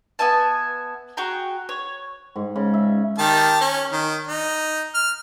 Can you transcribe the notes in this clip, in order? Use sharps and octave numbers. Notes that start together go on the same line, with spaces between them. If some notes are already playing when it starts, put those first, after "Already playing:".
B3 E5 G#5 A5
F#4 G#4 G5 A#5
C#5
G#2
C#3
E5
D#3 G4 A5
C#4
D#3
D#4
F6